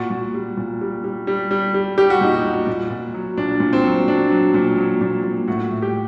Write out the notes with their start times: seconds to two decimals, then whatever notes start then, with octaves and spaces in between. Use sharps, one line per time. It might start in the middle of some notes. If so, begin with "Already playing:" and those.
Already playing: A#2 F#4
0.11 A#2
0.34 G3
0.57 A#2
0.81 G3
1.04 G3
1.27 G3
1.51 G3
1.74 G3
1.98 G3 G4
2.10 F#4
2.21 A#2 D#4
2.35 F#4
2.44 G3
2.67 A#2
2.90 A#2
3.14 F#3
3.37 A#2 D4
3.60 A#2
3.73 C4
3.84 F#3
4.08 F#3 D4
4.30 F#3
4.54 A#2
4.78 F#3
5.01 A#2
5.23 A#2
5.48 A2 F#4
5.71 A2
5.82 G4